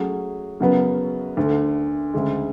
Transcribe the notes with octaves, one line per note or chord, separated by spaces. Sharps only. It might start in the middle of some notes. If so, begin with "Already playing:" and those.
Already playing: F#3 A3 C#4 G#4
F#2 C#3 F#3 B3
D2 D3 A3
D2 C#3 G#3